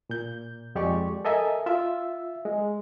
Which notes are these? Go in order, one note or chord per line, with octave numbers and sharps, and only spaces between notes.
A#2 G6
F2 G#3 G4 D5 C#6
A4 A#4 D#5 E5 G#5
F4 E5 E6
G#3